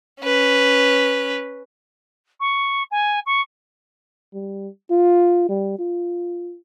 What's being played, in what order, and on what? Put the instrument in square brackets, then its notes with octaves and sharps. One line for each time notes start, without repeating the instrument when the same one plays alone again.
[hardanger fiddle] C#4 B4
[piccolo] C#6
G#5
C#6
[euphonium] G3
F4
G3
F4